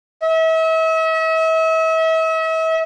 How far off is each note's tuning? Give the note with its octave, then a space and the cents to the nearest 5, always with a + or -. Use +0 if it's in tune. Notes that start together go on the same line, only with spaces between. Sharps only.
E5 -40